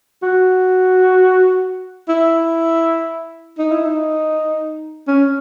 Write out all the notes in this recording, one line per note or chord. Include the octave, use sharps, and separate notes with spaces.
F#4
E4
D#4
E4
D#4
C#4